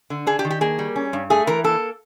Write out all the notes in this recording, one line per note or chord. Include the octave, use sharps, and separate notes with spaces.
D3
D4 G#4
G4
D#3
G4
A#3 G#4
G3
C#4
G2
A3 G#4
E3 A#4
A#3 A4